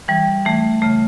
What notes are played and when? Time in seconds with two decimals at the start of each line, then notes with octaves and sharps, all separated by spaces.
0.08 E3 G3
0.45 E3 A3
0.82 C#3 A3